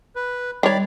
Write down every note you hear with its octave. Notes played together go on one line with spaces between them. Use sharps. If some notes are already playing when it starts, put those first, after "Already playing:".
B4
D#3 G3 C#5 D5 B5 D6